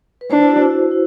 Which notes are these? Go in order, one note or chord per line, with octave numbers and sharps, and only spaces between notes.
B4
D4 C5
E4
F#4
E4
F#4
E4